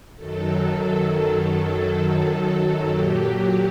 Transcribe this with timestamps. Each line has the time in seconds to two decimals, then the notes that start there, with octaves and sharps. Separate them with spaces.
0.16 F#2 D#3 F#3 A4
1.51 A4
2.86 A#2 F#3 G4